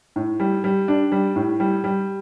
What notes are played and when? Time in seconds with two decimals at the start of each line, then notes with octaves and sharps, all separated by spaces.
0.16 A2
0.40 G3
0.64 G3
0.88 D4
1.12 G3
1.36 A2
1.60 G3
1.84 G3